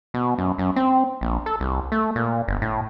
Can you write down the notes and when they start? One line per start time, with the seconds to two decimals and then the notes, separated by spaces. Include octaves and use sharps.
0.14 B2
0.38 F#2
0.58 F#2
0.76 C4
1.21 A#1
1.46 A4
1.60 C2
1.92 A3
2.16 A#2
2.48 G1
2.62 A2